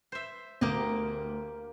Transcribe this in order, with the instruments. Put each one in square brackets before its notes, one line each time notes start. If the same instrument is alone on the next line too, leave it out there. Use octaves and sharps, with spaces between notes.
[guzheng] C5 E5
[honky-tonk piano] D2 [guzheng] A#3 G4 D#5